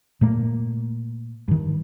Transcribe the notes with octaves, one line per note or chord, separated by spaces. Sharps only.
A#2 A3 A#3
G2 D#3